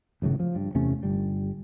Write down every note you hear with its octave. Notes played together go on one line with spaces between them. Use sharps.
G#1 F#2 A2 C#3
F3
G2
E2 C3 A3 C#4
G1 G3